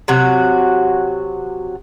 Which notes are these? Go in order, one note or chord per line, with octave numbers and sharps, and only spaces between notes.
C3 F#3 F#4